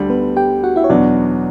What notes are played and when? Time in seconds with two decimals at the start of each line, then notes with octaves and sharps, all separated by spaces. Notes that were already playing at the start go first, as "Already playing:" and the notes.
Already playing: D2 D3 G3 D4
0.10 B3 B4
0.36 G4 G5
0.64 F#4 F#5
0.76 E4 E5
0.84 C#5
0.90 E2 B2 F#3 B3 D4 D5